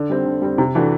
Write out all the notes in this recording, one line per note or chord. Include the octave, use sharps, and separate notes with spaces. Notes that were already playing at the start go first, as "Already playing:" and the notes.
Already playing: D3
G3 C4
D3
G3 C4
C3
E3 A3 D4 F#4